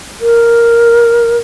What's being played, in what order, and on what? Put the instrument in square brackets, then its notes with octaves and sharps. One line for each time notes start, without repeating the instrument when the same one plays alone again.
[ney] A#4